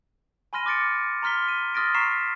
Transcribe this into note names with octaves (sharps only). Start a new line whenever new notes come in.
G#5 B5 C6 F6 A#6 D#7
D6 F6 A6 C#7 D7
A#5 C6 F6 B6 G7
D#7
C6 D#6 F6 A6 A#6 D7
A#5 C#6 B6 C7 E7